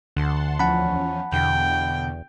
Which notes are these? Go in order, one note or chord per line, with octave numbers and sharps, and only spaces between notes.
D2 D3 F#5 A5 C6
E2 F3 C#4 F#5 A5 B5
E2 B2 D3 G5